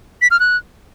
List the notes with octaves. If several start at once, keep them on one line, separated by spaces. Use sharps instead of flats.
B6
F6
F#6